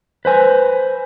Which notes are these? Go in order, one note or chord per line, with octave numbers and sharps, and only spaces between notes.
B4 C5 G#5